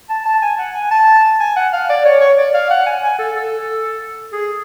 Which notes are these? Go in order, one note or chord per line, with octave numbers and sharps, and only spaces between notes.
A5
A5
G#5
F#5
G#5
A5
G#5
F#5
F5
D5
C#5
C#5
D5
F5
F#5
G#5
G#5
A4
A4
G#4